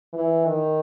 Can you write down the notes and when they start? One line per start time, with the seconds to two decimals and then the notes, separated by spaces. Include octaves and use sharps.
0.13 E3
0.46 D#3